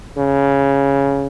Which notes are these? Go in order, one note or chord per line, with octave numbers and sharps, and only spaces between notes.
C#3